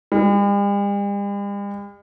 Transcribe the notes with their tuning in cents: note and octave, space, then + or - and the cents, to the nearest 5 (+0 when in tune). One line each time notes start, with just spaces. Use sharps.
G3 +45